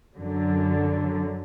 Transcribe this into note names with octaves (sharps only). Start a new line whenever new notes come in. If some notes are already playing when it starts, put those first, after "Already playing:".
F#2 D3 F#3